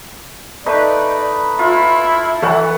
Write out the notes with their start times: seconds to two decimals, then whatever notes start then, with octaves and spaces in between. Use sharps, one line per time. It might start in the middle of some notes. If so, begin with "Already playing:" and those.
0.66 A3 D#4 B4 D5
1.59 E4 F4
2.42 E3 A3 F#5